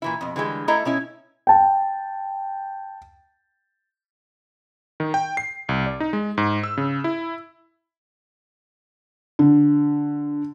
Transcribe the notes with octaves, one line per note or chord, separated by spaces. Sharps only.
A#2 E3 E4
F2 B2
D3 E3 G3 G#3
A3 E4 A4 D#5 A#5
B2 C#4 E4
G5 A5
D#3
G5
C7
C2
D5
D#4
G#3
G#2
E6
C#3
E4
D3